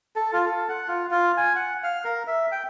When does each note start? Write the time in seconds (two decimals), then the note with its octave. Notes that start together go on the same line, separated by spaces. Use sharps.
0.16 A4
0.33 F4
0.45 A4
0.69 F#5
0.88 F4
1.11 F4
1.37 G#5
1.55 F#5
1.83 F5
2.04 A#4
2.27 E5
2.52 G5